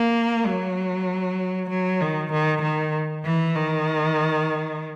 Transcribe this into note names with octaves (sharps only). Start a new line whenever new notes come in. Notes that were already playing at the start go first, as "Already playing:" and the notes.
Already playing: A#3
F#3
F#3
D#3
D#3
D#3
E3
D#3